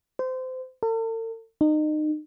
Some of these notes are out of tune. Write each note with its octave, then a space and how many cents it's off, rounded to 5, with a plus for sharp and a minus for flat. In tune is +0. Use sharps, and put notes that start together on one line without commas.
C5 -25
A4 +45
D#4 -30